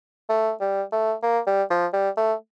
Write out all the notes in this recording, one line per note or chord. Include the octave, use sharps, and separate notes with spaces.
A3
G3
A3
A#3
G3
F3
G3
A3